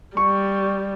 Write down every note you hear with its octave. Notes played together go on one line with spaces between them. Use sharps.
G3 C#6